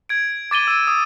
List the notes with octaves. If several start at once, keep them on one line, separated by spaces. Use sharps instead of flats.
G#6 D7
D6 A6 D#7 G7
E6 D#7
D#6